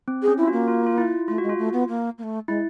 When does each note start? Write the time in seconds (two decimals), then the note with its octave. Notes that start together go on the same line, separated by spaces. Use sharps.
0.08 C4
0.22 G#4
0.28 C#4
0.38 E4
0.43 F4
0.48 F#4
0.53 A#3
0.68 F4
0.86 F4
0.98 E4
1.28 A3 F4
1.38 G#3 F#4
1.50 F4
1.58 A3
1.73 B3
1.89 A#3
2.18 A#3
2.23 A3
2.48 G#3 E4